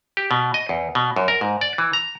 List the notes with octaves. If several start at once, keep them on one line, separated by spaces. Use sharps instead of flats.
G4
B2
D#5
E2
B2
F#2
A#4
G#2
D5
E3
A#5